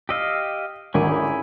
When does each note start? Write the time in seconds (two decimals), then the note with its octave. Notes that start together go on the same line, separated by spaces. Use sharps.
0.09 G4 D#5 F5 E6
0.94 G#1 D2 C#4 E4 G#4 A#4